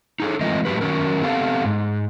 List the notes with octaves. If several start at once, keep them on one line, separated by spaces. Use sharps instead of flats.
D#4 G#4 A4
E3 G#3 A3 C4 F4 D#5
A2 F#3 G#3 G4 B4
D#3 F#3 C#4 A#4
B3 C4 G4 A4 F5
G#2